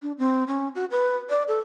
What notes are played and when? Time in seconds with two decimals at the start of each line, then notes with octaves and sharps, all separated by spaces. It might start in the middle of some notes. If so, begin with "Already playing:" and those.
0.02 D4
0.18 C4
0.48 C#4
0.75 F#4
0.91 B4
1.30 D5
1.48 A4